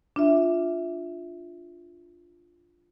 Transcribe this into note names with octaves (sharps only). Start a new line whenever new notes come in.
D4 F4 E5